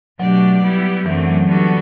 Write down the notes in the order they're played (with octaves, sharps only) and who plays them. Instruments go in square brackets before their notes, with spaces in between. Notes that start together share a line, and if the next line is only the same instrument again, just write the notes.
[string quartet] B2 A3 D4 G4 D5 [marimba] F#3
[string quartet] G3 B3 E4 G4
[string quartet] F#2 D3 A3 C4 [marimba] E3
[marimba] F#3
[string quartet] D3 G3 B3 F#4 A4 [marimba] E3